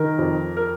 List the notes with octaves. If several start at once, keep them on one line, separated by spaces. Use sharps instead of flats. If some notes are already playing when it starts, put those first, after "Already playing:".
Already playing: D#3 A#4
F2
A#4